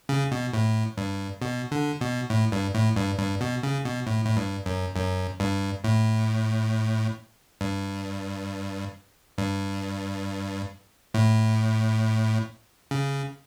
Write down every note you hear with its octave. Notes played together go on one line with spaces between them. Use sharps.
C#3
B2
A2
G2
B2
D3
B2
A2
G2
A2
G2
G2
B2
C#3
B2
A2
A2
G2
F#2
F#2
G2
A2
G2
G2
A2
C#3